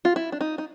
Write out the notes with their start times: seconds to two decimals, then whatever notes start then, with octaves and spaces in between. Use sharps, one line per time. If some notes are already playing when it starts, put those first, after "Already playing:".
0.05 F4
0.16 E4
0.32 D4
0.41 D#4
0.58 D#4